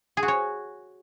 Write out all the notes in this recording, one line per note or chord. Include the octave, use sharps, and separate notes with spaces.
G#4
F#4
C#5